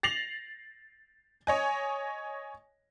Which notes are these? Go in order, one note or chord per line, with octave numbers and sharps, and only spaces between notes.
A6 A#6 C7 F7 F#7
C#5 D#5 G#5